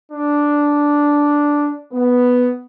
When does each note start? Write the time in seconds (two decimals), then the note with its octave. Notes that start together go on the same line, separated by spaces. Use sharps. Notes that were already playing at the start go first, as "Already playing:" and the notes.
0.12 D4
1.92 B3